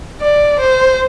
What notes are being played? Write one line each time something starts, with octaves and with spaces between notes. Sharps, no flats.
D5
C5